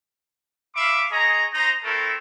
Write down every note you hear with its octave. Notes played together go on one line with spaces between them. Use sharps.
E5 F5 B5 C#6 D6
G#4 C#5 D#5 A#5
D#4 C5 A#5
A3 C4 E4 A4 A#4